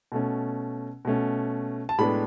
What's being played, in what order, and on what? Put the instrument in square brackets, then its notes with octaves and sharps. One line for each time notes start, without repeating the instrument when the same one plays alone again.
[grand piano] B2 A3 C#4
B2 A3 C#4
A5
A2 G#3 B3 D4 B5